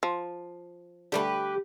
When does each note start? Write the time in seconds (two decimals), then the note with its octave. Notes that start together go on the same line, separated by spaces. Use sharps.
0.03 F3
1.12 D3 G3 A3 G4 A#4 B4